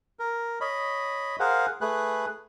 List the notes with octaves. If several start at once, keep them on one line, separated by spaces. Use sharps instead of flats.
A#4
C#5 D#5 B5
G#4 A#4 C5 F5 F#5
A3 G#4 B4 F#6